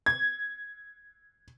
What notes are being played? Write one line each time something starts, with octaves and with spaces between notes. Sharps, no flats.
G#6